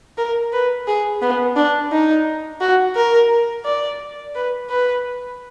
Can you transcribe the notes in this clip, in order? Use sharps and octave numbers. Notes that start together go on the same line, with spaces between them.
A#4
B4
G#4
B3
D4
D#4
F#4
A#4
D5
B4
B4